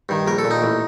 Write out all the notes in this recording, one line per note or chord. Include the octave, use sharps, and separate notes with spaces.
G2 D#3
A#1 A#4
A4
A#2
D#4
A1